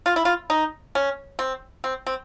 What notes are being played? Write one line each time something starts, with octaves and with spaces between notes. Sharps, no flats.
F4
E4
F4
D#4
C#4
C4
C4
C4